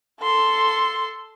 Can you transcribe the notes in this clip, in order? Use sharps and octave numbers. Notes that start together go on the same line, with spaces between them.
A4 C6